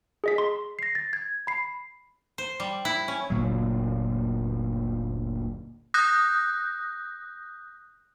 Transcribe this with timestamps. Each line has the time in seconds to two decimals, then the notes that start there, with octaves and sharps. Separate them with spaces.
0.24 G#4 D#5 B6
0.38 C6
0.79 A#6 C7
0.95 A6
1.13 G#6
1.47 B5 C7
2.38 C5
2.60 G3
2.85 E4
3.08 C#4
3.30 F#1 D2 A#2 F#3
5.94 D#6 F#6 G6 A#6